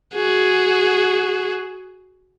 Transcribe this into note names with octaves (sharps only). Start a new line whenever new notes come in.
F#4 G#4